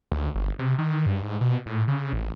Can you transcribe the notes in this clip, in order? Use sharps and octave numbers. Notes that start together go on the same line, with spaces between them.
D2
G1
C3
D#3
G2
G#2
B2
A2
C#3
A1